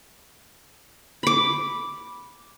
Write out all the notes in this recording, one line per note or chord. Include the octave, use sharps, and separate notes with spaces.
B5 D6